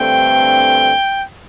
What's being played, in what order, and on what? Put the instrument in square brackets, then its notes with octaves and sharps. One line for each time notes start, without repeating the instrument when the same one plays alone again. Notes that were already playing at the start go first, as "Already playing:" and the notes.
Already playing: [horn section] G2 D3 A3 C4 G5